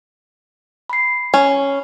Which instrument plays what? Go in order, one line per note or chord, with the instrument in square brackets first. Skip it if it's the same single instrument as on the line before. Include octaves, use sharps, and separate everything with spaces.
[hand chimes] B5 C7
[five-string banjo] C#4